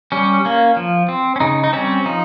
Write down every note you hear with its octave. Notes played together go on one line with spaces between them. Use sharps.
G3 C#4
A#3 C#4
F3
C4
C#4
C#3 D#4
D#4
G3 C4 C#4
F3 D#4